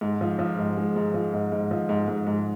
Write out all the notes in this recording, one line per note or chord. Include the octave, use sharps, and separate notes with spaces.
G#2
F3
F3
G#2
G#3
G#2
F3
G#2
G#2
F3
G#2
G#2
G#2